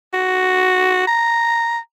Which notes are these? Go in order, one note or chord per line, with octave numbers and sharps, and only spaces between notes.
F#4
A#5